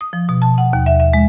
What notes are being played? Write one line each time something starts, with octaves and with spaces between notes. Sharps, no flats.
D#6
F3
B2
A5
F#5
D#2
E5
E5
G#3